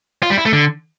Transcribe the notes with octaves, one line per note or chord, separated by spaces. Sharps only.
F4
G3
E4
A3
D3